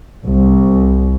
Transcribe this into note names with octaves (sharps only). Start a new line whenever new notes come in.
C2